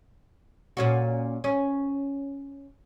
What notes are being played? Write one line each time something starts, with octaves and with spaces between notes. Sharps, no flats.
A#2 C#4 F#4
C#4